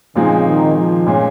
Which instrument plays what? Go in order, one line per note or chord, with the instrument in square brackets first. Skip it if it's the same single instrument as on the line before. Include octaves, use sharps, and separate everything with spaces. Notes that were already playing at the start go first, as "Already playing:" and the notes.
[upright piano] A#2 F3 G#3 C4 D#4 [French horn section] C#3
[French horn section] D#3
F3
[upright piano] A#2 G#3 C#4